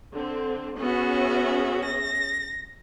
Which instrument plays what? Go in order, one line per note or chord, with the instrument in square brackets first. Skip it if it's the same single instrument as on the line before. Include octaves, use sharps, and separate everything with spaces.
[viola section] D3 C4
[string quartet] B3 F#4 [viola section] C#4 G#4 E5
[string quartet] A#6